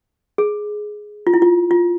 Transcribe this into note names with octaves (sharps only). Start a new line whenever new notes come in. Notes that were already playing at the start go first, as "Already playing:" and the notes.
G#4
F4
E4
F4
F4